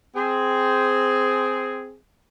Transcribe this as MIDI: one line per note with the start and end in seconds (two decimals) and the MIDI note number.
0.16 1.96 60
0.16 1.96 68